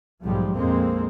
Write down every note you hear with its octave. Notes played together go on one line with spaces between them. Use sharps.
B1 G#2 F3 G3 G#3
A#1 F2 G#3 A#3 C4